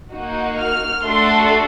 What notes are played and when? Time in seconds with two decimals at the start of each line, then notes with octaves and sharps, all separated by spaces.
0.13 A#3 D#4 F#4
0.59 F6
1.04 A3 D4 F#4 A4 C6